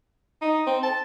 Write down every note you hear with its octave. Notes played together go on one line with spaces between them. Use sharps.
D#4
C4
A5